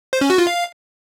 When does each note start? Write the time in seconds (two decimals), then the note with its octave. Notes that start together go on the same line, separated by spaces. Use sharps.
0.13 C5
0.21 C#4
0.30 F#4
0.38 F4
0.47 F5